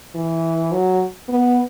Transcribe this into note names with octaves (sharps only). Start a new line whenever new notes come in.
E3
F#3
B3